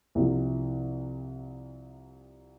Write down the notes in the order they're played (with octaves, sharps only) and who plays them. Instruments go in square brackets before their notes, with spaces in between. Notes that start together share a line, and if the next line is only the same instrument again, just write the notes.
[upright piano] C2 C3 F3